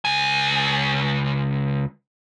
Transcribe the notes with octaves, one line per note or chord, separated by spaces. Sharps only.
C#2 G#5